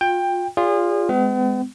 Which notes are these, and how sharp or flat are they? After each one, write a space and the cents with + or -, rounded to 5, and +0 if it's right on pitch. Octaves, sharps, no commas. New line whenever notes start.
F4 +30 G5 +15
F4 +0 G#4 -35 D5 -30
G#3 +0 B3 +45